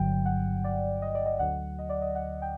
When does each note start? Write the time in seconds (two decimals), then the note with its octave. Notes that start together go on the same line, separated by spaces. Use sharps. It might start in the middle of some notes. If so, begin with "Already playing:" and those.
Already playing: G1 G2 D3 F#3 G5
0.25 F#5
0.64 D5
1.02 D#5
1.15 D5
1.26 D#5
1.39 D2 D3 F#3 F#5
1.79 D#5
1.89 D5
2.02 D#5
2.15 F#5
2.42 G5